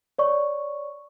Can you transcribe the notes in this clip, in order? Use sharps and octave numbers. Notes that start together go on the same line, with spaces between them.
C#5 D5 C#6